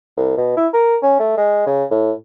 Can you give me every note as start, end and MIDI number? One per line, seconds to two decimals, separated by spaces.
0.17 0.34 36
0.37 0.53 47
0.57 0.67 64
0.73 0.97 70
1.02 1.17 61
1.19 1.35 57
1.37 1.66 56
1.66 1.84 49
1.90 2.11 45